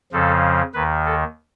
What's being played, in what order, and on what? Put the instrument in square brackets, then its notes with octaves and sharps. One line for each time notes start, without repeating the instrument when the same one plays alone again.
[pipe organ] F2 C#3 F3 A4
D#2 D#3 B4
A4